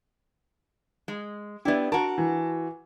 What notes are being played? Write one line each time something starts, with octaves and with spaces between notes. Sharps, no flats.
G#3
B3 D4 E4 G4 D5 E5
F#4 A#4 A5
E3